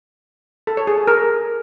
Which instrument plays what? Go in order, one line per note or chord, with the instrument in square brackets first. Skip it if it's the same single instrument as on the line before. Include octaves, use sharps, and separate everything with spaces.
[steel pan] A4
C#5
G#4
A4
A#4